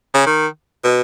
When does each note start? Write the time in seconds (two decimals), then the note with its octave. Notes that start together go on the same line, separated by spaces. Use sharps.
0.14 C#3
0.26 D#3
0.84 B2